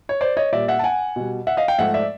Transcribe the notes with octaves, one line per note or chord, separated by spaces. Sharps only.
C#5
C5 D5
C#5 D#5
A#2 G3 D5 E5
E5 F#5
A5
F#5 G#5
B2 G3
E5 F#5
D#5 F5
F5 G5
G#2 F3 A3 E5 F#5
D5 E5